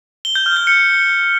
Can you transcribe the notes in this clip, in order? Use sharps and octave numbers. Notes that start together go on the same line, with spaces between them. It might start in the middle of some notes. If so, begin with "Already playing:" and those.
G7
G6
F6
G6
C#7